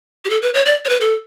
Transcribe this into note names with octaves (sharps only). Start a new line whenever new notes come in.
G4
A4
B4
C#5
D5
C#5
B4
A4